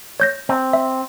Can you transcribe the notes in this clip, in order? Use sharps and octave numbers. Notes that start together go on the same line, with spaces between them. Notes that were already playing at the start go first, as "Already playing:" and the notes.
C#5 G6 A#6
C4
E5